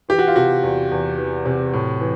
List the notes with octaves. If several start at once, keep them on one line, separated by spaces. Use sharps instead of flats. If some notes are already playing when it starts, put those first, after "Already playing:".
E3 G4
F#4
F4
C3 F#4
E2
E2
E3
C3
A2
E3